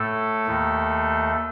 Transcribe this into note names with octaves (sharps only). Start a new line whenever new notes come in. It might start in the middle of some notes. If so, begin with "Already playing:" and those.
Already playing: A2 A3 A4
D#2 D#3